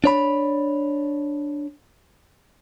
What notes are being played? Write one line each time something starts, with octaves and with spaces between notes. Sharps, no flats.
D4 C#5 B5